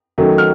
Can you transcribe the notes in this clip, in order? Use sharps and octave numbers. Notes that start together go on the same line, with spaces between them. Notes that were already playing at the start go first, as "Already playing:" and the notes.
D#3 F#3 A3 C#4
F6